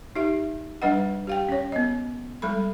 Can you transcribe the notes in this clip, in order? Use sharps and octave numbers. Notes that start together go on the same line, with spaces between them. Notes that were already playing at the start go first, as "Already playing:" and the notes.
D#4 G4 E5
G3 D4 B4 D#5 F#5
G4 F5 G5
C#4 C#5
B3 D#5
G3 G#3 A4 B5